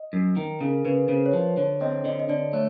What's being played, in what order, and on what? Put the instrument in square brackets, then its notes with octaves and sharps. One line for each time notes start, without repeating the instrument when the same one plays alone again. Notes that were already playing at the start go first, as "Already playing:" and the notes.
Already playing: [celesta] D#5
[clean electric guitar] F#2
D#3
[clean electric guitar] C#3 [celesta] A#4
[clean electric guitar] C#3 [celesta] B4
[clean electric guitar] C#3 [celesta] C5
[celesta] C#5
[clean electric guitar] F3 [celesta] C5
[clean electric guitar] D3 [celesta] C#5
[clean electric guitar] C4 [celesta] D#5
[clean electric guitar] D3 [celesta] D#5
[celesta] D#5
[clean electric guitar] D3 [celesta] D5
[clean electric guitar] A3 [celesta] C#5